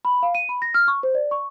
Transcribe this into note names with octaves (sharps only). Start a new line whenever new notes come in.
B5
F5
D#7
B5
A#6
F6
C#6
C5
D5
C#6